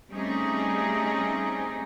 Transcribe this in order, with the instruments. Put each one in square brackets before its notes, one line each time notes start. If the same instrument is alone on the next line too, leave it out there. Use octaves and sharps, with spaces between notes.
[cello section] G3 A3 C4 C#4 D#4 G#4